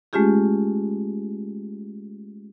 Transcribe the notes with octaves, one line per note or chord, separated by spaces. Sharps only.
G#3 A3 C#4 F4 G4 G#4